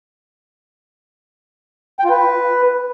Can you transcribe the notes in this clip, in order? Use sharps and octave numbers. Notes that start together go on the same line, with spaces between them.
G5
F4
B4